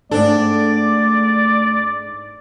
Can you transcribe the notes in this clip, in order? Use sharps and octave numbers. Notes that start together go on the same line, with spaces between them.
G#2 A3 C4 D4 A4 D5